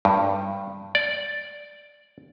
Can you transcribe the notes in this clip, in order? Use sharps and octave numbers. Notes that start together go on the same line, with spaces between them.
G2
D5